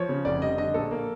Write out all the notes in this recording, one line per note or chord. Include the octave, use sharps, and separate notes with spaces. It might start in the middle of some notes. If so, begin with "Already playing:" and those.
Already playing: F3 C#5
C#3
F1 D5
G3 D#5
D3 D#5
A#1 A4
A#3